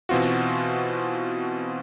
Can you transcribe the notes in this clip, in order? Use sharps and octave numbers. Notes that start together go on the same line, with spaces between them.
B2 E3 C4 F4 F#4